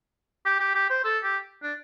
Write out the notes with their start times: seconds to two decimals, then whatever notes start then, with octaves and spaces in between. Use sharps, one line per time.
0.46 G4
0.60 G4
0.75 G4
0.90 C5
1.05 A4
1.24 G4
1.63 D4